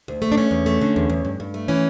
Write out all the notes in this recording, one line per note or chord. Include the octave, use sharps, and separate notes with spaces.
D2
A3
D4
E2 C#4
E2
A3
D3
E2
E2
G2
G2
A3
E3 C#4